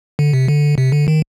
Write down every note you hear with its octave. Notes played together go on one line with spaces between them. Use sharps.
D3
C3
D3
C3
D3
D#3